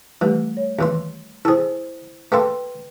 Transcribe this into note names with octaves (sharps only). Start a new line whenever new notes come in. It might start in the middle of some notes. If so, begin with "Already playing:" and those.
E3 G3 A3 G4
C#5
D#2 E3 C6
E4 G#4 A4 C5
A3 A#3 A4 B4 G5 C6